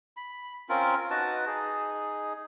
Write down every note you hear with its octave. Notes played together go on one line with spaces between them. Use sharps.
B5
C4 C#4 F4 A#4
D#4 F#4 B4 A5
D#4 G#4